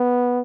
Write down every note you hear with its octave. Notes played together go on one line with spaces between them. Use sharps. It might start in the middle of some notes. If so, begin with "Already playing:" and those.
Already playing: B3